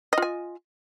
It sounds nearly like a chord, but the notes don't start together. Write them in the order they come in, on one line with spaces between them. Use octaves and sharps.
D#5 F4 G#5